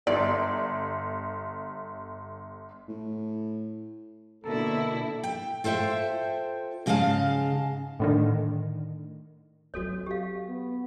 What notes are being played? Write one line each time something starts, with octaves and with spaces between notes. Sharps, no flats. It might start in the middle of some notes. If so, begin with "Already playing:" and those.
G1 D5
A2
B2 D3 A#3 E4 A4 A#4
G5
F4 A4 C5 E5 G5
G#2 C#3 G#3 A4 F5 A5
A2 D3 D#3
F#3 C4 F#4 A4 C#5
G4 F5
B3